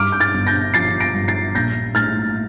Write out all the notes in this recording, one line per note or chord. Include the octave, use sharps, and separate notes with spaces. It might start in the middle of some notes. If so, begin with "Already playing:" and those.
Already playing: G2 D6 F6
G6
F6 A6
G1
G6 A#6
F3 A6 C7
A#6 D7
G2
A6 C7
A#1 G6 A#6
A2 F6 A6